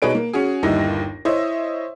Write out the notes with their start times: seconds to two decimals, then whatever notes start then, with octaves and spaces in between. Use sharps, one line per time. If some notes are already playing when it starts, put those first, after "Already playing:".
0.02 B2 D#4 G#4 B4 C#5 D7
0.15 A#3
0.33 C#4 F#4 G#4
0.63 G1 D#2 G3 D#4 E4 A#6
1.25 E4 C5 C#5 D#5 E5